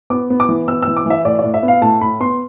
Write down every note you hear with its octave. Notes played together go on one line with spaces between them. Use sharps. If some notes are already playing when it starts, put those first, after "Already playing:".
B3 D6
B3
D6
E3
B3 E6
E6
E3
D6
E3 E5
A2 D5
A2 D5
E5
B3
F5
A2 A5
A2 B5
B3 C6